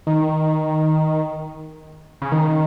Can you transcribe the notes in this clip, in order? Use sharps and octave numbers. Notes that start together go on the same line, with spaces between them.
D#3
C#3
D#3